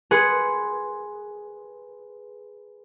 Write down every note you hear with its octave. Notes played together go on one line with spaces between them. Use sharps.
G#4 B4 C6 F#6 C#7